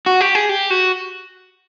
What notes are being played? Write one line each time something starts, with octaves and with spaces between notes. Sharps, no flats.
F#4
G4
G#4
G4
F#4